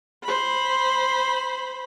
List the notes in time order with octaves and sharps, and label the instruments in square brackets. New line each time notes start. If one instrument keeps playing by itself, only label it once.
[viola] C5 B5